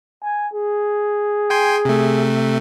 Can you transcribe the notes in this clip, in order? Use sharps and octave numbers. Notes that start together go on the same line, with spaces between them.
G#5
G#4
G5 G#5 C6
C3 A3